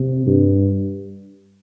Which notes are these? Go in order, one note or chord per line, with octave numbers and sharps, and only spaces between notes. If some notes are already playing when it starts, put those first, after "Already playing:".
Already playing: C3
G2